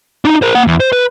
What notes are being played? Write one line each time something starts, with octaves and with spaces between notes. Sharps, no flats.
D4 D#4
A#4 C5
A#3 F#5
E2
C5
B4